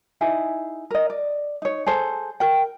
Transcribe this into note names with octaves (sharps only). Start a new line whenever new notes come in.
D#4 E4 G#4
A#4 D#5
D5
D#4 C#5
G#4 A4 C5
A#4 G5